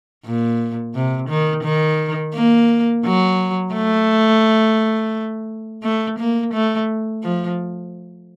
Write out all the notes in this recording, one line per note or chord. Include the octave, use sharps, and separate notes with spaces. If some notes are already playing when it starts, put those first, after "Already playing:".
A#2
C3
D#3
D#3
A#3
F#3
A3
A3
A#3
A3
F3